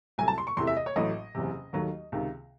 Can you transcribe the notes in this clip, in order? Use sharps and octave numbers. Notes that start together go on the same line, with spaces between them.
C2 C3 F#3 A3 G#5
A5
C6
C#6
E2 C3 E3 A3 C6
E5
D#5
C#5
A1 A2 F#3 A3 D#5
F#1 E2 C3
D#2 D#3 F#3 A3
C#2 C3 D#3